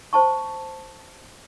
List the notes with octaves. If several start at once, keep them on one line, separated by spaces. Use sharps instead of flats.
C5 A5 C#6